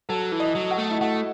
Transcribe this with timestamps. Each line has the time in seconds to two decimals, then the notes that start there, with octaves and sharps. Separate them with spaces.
0.09 F#3 A4
0.32 E3
0.40 D#5
0.55 F#3
0.71 F#4
0.78 A3
0.91 E4
1.01 A3 F#4